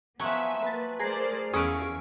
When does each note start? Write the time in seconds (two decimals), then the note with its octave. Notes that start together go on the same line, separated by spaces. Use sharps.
0.19 F3 F#3 B3 E5 G#5 C#6 F#6
0.62 A#3 B4 A6
1.00 A3 G#4 A#4 C5 D5 C7
1.54 E2 C#4 G#4 B4 F5 C#6 E6 D7